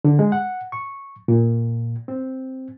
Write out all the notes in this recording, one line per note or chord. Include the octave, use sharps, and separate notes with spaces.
D3
G#3
F#5
C#6
A#2
C4